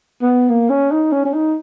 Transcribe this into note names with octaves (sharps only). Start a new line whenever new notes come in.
B3
A#3
C#4
D#4
C#4
C#4
D#4